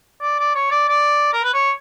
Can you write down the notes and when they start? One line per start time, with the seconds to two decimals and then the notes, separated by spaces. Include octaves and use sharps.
0.22 D5
0.39 D5
0.55 C#5
0.71 D5
0.88 D5
1.33 A#4
1.43 B4
1.54 C#5